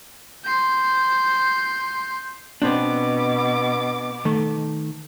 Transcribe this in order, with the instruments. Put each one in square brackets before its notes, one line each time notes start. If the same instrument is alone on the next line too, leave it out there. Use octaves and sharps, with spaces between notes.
[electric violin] C6 G6
[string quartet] B2 D6 [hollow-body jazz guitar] B3 C4 D4
[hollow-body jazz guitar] D#3 A3